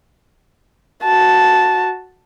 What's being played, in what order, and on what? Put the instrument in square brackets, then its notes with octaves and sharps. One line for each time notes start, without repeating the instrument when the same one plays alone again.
[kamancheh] F#4 A5